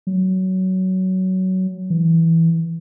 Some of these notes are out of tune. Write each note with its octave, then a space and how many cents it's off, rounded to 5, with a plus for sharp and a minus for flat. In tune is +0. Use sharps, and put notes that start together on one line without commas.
F#3 +15
E3 -5